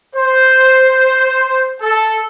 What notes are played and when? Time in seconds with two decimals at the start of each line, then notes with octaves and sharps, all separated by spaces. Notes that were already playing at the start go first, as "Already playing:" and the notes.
0.15 C5
1.81 A4